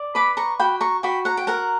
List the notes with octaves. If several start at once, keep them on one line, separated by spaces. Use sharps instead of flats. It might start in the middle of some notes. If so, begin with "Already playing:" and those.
Already playing: D5
B4 B5 D6
A#5 C#6
F#4 G5 B5
A#5 C#6
F#4 G5 B5
F#5 A#5
G5
A#4 F#5 A#5